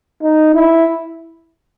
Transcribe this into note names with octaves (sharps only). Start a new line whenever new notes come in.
D#4
E4